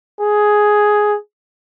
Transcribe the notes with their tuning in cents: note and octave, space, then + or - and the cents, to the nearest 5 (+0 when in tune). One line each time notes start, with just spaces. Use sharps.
G#4 +5